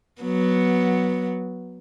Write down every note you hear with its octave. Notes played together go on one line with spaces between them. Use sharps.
F#3 B3